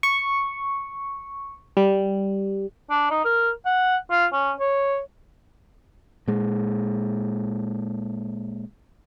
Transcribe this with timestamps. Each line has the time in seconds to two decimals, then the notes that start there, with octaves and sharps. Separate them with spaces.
0.03 C#6
1.77 G3
2.90 D4
3.10 D#4
3.25 A#4
3.65 F#5
4.10 F4
4.33 C#4
4.59 C#5
6.28 A#2 G#3